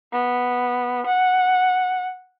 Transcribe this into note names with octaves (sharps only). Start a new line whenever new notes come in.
B3
F#5